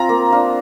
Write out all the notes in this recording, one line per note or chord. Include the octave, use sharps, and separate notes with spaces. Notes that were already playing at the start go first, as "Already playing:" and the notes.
Already playing: C4 F4 A#5
A#3
D4 F4 C5